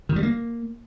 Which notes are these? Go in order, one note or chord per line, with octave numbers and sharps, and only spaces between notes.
D#3
G3
A#3